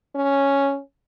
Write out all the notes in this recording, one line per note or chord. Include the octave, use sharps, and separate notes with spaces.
C#4